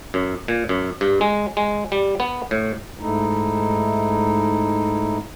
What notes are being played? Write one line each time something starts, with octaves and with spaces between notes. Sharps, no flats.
F#2
A#2
F#2
G2
G#3
G#3
G3
B3
A2
G#2 A3 D#4 E4